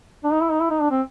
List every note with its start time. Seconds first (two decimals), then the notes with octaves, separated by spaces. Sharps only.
0.24 D4
0.32 D#4
0.41 E4
0.51 D#4
0.61 E4
0.70 D#4
0.80 D4
0.91 C4